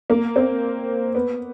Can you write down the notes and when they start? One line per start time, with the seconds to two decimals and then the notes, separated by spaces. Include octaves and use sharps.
0.10 A#3
0.36 C4
1.15 B3